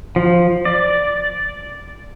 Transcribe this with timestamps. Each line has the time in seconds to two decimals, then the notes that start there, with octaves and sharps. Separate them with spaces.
0.16 F3
0.65 D5